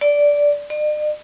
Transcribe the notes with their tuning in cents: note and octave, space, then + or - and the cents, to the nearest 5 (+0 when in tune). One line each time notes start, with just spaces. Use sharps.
D5 -10
D5 +45